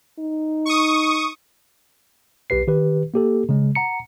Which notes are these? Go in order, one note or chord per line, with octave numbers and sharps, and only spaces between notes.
D#4
C#6 D#6
B1 G4 B4 C7
D#3 G4 B4
A#3 G4 A4
C#3 G#3
F#5 A#5 C#7